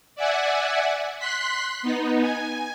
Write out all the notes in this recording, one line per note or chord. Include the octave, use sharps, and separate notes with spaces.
D5 E5 F#5 G#5
C6 F#6 B6
B3 D#4
G#5